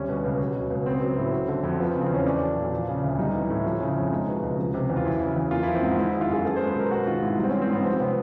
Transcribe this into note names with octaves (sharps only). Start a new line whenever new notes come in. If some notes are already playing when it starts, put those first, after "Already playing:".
Already playing: D2 G3 C#4
B2
C#2
F#3
B2
C#2
B3 C4
F#3
A2
F#3
D3
F2
F3 B3
C4
C#3
C4
E2 C#4
A3 D4
F#3
A#2
F3
C#3
D2
G3 D#4
E3
A2
F3
C#3
F2
G#3 D#4
B2
C#2
F3
C3
E2
F4
F#3 E4
C#3
E2
A#3 F4
F3 E4
C4
G#2
G#3 E4
D#3 E4
F4
F#2 G#4
B3 A4
G#3 C5
B4
B2 A#4
G#3 F#4
D#3 F4
G#2 E4
G3
C4
E3 C#4
C4
G#2 B3
F3 C4
C3 B3